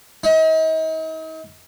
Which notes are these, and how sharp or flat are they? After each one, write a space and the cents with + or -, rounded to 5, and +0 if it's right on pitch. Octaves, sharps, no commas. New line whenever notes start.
D#4 +40